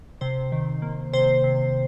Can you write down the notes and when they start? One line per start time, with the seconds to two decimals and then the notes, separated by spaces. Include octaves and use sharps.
0.21 C3 C5
0.52 D#3
0.82 A#3
1.13 C3 C5
1.44 C3